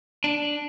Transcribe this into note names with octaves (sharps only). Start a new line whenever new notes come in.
D4